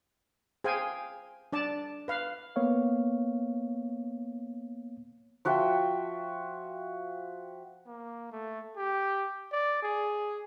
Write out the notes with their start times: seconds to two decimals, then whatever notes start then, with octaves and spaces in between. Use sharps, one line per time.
0.64 G#4 C5 F5 G5 G#5
1.53 D4 D5 A5
2.08 B4 F5
2.56 A#3 B3 C#5 F5
5.45 F3 F#4 E5 G5
7.87 A#3
8.32 A3
8.76 G4
9.52 D5
9.82 G#4